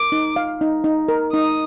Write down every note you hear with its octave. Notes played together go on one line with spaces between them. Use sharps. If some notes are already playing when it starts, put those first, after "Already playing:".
Already playing: A#4 D6
D#4
F5
D#4
D#4
A#4
D#4 D#6